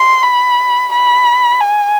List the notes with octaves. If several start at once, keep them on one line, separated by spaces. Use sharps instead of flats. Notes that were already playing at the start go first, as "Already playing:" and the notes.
Already playing: C6
B5
B5
G#5